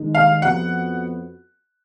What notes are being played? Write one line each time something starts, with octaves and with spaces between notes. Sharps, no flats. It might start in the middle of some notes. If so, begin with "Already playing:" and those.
Already playing: D#3 G#3 D#4
F5
F2 F3 B3 F#4 F#5